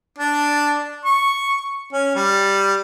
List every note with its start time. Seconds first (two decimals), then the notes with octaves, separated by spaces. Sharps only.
0.19 D4
1.05 C#6
1.93 C#4
2.15 G3